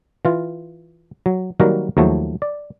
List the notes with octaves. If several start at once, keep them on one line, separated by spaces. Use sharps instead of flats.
E3 F4
F#3
D#3 F#3 G3 A#3 F#4 A#4
D#2 F3 F#3 A3
D5